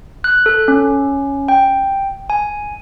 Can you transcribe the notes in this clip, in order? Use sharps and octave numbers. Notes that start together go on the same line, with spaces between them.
F#6
A4
C#4
G5
G#5